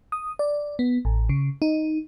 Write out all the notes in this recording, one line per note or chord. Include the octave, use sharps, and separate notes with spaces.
D#6
D5
B3
A1
C#3
D#4